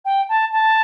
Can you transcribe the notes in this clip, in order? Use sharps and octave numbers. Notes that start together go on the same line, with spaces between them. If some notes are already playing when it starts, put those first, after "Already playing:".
G5
A5
A5